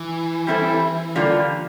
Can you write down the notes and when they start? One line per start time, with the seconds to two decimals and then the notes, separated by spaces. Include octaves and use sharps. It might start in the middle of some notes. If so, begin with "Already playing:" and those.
Already playing: E3
0.47 G3 C4 E4 A4
1.15 D3 G3 A#3 D4 F4